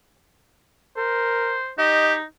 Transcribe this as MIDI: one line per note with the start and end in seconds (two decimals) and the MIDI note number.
0.97 1.59 70
0.97 1.71 72
1.78 2.24 63
1.78 2.14 67
1.78 2.14 75